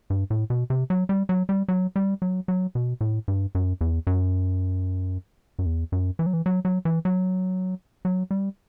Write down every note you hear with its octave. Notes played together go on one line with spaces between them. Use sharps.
G2
A2
B2
C3
F#3
G3
F#3
G3
F#3
G3
F#3
F#3
B2
A2
G2
F#2
E2
F#2
F#2
E2
F#2
E3
F#3
E3
F#3
F#3
E3
F#3
F#3
G3